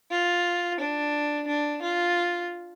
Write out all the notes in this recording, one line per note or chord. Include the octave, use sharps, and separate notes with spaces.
F4
D4
D4
F4